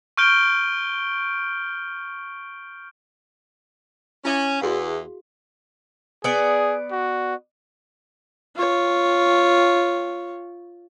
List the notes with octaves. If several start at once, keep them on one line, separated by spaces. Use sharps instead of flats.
C#6 F6 G6 D7 G7
C#4 E4 E5 D6
E2 F#4 G#4 F5
B3 G#4 D5
F#4
F4 C#5